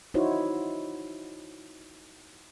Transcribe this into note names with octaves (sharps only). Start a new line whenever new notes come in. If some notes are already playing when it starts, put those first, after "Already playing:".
D#4 E4 F#4 C5 C#5